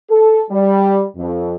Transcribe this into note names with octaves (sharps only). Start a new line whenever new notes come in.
A4
G3
F2